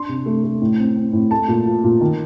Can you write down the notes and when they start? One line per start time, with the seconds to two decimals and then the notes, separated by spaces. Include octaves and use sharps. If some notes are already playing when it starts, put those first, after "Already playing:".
Already playing: D4 C6
0.09 C3
0.26 A3
0.43 A3
0.61 A2
0.78 C4
0.96 C4
1.13 A2
1.31 A3 A5
1.48 A#2
1.65 F3
1.84 A#2
2.01 D#3